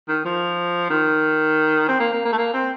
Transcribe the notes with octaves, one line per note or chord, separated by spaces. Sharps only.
D#3
F3
D#3
C4
A#3
A#3
A#3
A3
A#3
C4